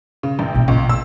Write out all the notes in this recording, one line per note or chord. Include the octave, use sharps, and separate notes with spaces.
C#3
A1
A#1 B2
C#2
E6